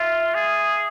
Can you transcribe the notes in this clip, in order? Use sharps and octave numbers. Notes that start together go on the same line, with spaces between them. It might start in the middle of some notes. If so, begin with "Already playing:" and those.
Already playing: F4 E5
G#4